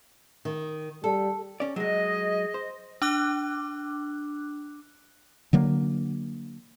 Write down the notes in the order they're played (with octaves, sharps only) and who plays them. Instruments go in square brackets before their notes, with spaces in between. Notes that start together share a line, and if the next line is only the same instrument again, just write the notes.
[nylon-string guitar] D#3
[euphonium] G3 [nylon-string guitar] A4
[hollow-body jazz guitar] C#4 D5
[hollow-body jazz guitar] F#3 G#3 [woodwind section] G#4 D#5
[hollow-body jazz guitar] C5
[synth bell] D4 D6 F#6
[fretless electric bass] D3 F#3 A#3